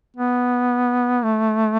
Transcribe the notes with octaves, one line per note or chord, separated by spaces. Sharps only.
B3
A3